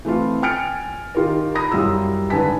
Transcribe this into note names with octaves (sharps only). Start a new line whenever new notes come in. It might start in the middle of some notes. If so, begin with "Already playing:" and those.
E3 A3 C4 E4 F4
G5 G#5 F6 A6 C#7 D7
D#3 F4 G4 A#4
A#5 B5 D#6 A#6
F#2 G3 E4 F4 E6
G#1 D3 B4 G#5 A5 B6